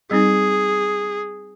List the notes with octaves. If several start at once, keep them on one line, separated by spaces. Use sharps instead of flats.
G3 C4 D#4 G#4